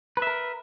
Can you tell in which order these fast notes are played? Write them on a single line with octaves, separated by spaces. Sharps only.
B4 E5 A#4